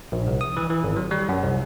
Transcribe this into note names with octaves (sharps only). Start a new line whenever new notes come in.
A#1
C2
D#6
E3
E3
G#1
F#3
G3
F#2
C2